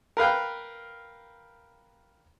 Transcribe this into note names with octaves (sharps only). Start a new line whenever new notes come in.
A#4 B4 F5 G5